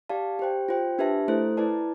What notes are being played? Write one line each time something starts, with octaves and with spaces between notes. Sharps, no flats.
G4 D5 F5 A5
G4 C5 G5
F4 C5 G5
D4 G4 B4 E5 A5
A3 E4 A4 C5
E4 B4 D5 A5